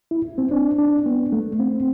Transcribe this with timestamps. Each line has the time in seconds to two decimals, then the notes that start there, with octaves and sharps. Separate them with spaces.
0.11 E4
0.38 C4
0.51 D4
0.78 D4
1.06 B3
1.32 A3
1.60 C4